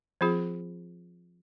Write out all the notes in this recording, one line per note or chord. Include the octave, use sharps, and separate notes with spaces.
F3 C4 F4 G#4